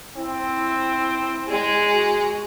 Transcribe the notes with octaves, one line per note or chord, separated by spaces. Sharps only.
C4 E4
G#3 G#4
F#4